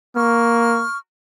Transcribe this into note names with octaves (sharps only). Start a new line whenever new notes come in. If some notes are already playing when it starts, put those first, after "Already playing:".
A#3 C#6 F6